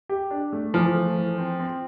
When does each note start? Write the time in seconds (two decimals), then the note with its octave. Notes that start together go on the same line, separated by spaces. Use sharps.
0.09 G4
0.31 D4
0.53 A3
0.74 E3 F3
0.95 A3
1.17 E3
1.38 C4
1.60 C4